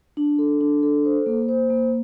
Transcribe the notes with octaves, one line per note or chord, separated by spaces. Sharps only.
D4
A4
D4
A4
C5
A#3
C5
A#3